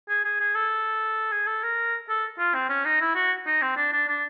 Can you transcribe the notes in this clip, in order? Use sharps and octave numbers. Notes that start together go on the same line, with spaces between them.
G#4
G#4
G#4
A4
G#4
A4
A#4
A4
F4
C4
C#4
D#4
E4
F#4
D#4
C4
D4
D4
D4